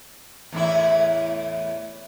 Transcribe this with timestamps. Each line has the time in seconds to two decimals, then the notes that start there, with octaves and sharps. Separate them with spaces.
0.52 E2 A2 E4